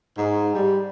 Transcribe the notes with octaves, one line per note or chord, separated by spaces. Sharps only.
G#2
G3